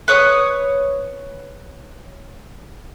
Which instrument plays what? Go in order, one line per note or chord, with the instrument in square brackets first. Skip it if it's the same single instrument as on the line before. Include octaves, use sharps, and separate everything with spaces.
[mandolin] B4 C#5 D#6